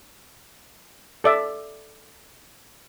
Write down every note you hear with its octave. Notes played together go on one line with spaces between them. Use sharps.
A4 D5 E5